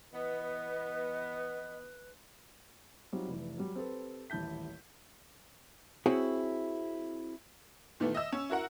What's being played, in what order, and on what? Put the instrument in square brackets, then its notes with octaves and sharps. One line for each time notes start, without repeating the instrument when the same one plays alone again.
[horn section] E3 B3 [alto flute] B4 [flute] D#5
[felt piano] F#3 G3 C4 D#4 F4
F1 E3
F#3 G3
C4 G4 A4 B4
D#1 A1 E4 A5 G6 B6
[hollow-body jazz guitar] C4 E4 F#4 G#4 C#5
[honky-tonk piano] A#2 D#3 E3 A3 B3
D#5 E5 E6
C#4
E4 F#4 A#4 F#5